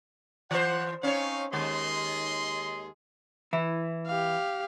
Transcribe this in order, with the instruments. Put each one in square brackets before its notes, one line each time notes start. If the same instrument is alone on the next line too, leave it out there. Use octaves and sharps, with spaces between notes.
[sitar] E3 C5 [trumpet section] F#5
[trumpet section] C4 D#4 F5 [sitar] C#4 C#5
[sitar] D#2 G#3 [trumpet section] G#4 D#5 C6
[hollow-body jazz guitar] E3 E4
[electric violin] G4 F5